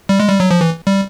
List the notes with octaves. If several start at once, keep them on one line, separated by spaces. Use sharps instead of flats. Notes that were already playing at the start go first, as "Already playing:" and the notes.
G3
G#3
G3
F#3
F3
E3
G3